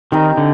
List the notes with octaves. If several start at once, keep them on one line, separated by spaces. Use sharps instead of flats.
D#3 G3 C4 D#4
D3